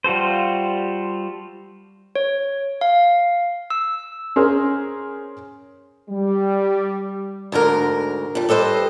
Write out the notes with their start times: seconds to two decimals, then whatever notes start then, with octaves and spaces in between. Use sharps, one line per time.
0.04 G3 F4 F#4 A4 C5
2.16 C#5
2.81 F5
3.70 E6
4.36 C#4 G#4 A#4 C5
6.10 G3
7.52 D2 G#2 D3 A#4
8.35 F2 G3
8.49 G3 A4 B4 C5 D#5